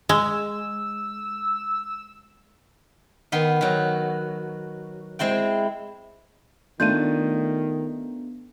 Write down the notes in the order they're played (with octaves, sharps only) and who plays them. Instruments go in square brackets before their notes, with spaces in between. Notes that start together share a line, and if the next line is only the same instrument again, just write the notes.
[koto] G#3 [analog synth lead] E6
[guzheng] D#3 B3 C6
D#3 F#3
G#3 C4 E4 G5
[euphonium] D#3 [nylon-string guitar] A3 D4 F4 [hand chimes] B3 [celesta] G6 D#7